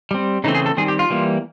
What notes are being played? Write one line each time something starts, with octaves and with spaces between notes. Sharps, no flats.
G3 C4
C#3 E3 A3 C4 D#4
G#4
A4
D#3 G3 C4 G#4
G4
F4
E3 G3 A#3